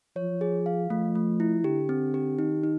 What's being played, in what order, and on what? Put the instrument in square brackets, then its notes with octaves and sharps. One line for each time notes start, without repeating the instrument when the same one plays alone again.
[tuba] F3 [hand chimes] C#5
[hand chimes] G#4
F5
[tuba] F3 [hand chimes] A3
[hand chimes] A3
E4
[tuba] D3 [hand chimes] G4
[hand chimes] C4
G4
[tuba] D#3 [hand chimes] D#4
[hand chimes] D#4